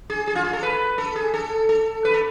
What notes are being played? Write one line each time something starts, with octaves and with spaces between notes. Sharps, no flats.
G#4
G#4
F4
G#4
A4
B4
A4
G#4
A4
A4
B4
A4